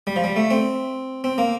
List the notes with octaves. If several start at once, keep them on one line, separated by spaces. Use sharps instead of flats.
G3
F3
G3
A3
C4
C4
A#3